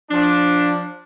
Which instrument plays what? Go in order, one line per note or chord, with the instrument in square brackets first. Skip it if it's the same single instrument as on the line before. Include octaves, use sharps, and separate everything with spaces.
[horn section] F3 D4